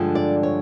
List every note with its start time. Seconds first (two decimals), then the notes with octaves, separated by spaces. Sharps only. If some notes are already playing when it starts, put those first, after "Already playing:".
Already playing: G2 D3 F3 G#3
0.15 D5
0.43 C#5